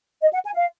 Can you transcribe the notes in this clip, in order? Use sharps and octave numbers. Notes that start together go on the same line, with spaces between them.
D#5
F#5
G#5
F5